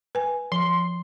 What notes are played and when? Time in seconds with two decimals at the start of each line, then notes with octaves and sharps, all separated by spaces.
0.15 B4 G#5
0.52 F3 C6